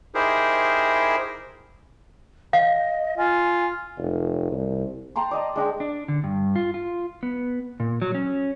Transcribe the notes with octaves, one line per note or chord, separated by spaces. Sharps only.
D#4 E4 G4 G#4 A#4 C5
D#5 F5
F4 G#5
F1
C2
G5 A5 A#5 C6
D5 D#5 A5
G#3 D4 D#5 G5
D4
D3
G2
F4
F4
B3
A#2
F#3
C#4